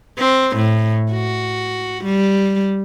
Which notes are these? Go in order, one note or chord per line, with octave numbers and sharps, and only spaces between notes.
C4
A2
F#4
G3